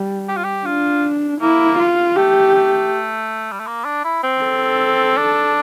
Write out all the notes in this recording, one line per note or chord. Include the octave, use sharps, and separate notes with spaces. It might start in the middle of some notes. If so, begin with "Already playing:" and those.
Already playing: G3
G4
F4
G4
D4 F4
A#3 E4
F4
A3 G4
A3
G3
A3
A#3
D4
E4
C4
A4
D4